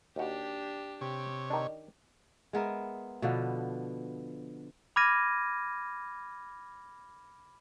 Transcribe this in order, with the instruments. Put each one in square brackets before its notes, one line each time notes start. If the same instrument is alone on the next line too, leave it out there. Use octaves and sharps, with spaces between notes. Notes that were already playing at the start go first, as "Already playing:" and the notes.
[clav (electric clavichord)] D#2 F#4 [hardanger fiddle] D4 G4
[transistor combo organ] C3 C#5 [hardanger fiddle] G4
[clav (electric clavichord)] D#3 D4
[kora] G#3 B3 A#4 E5
B2 D3 F3 B3
[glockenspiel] B5 D6 F6 G#6 A#6 D#7